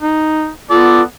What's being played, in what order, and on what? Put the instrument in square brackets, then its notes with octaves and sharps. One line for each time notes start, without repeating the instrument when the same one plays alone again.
[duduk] D#4
[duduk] B3 [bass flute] F4 [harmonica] A4 D5